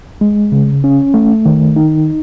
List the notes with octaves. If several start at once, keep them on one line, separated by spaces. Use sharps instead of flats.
G#3
C#3
C#4
A3
D#3
D#4